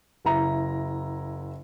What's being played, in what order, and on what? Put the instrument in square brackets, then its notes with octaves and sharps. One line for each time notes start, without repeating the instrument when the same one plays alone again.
[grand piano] F#1 E4 A#5